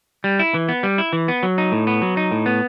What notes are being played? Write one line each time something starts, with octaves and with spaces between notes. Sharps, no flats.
G3
E4
E3
B3
G3
E4
E3
B3
F#3
D#4
A2
B3
F#3
D#4
A2
B3